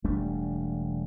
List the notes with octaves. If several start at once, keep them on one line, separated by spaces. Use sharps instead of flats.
E1 G3 A3 D4